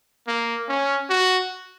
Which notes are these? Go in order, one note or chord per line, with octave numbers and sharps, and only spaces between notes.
A#3
C#4
F#4